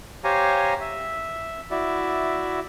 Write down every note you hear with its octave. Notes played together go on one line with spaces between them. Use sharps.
G4 C5 C#5 F5 G#5 A#5
E5
E4 F#4 D5 E5